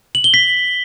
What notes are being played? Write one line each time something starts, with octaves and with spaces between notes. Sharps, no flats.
F#7
G7
B6